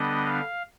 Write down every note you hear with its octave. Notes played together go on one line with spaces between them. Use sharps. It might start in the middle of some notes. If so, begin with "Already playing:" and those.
Already playing: D3 G3 B3 D4 D#5
F5